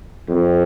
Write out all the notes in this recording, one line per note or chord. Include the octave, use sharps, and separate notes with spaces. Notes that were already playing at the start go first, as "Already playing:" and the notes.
F2